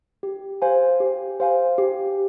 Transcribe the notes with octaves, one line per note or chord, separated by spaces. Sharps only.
G4
C5 F5 G#5
G4
C5 F5 G#5
G4